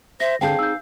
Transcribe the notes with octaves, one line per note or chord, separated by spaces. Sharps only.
C5 E5 A#6
D3 C4 G#4 F5 G5 A5 G6
D#4 E6 G6